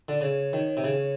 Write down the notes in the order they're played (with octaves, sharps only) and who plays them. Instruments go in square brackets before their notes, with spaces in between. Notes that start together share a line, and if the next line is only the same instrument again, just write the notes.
[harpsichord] D3 [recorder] D5
[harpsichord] C#3 [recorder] C#5
[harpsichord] D#3
C3
C#3